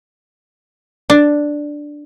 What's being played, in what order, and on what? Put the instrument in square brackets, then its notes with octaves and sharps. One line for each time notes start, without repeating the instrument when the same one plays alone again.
[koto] D4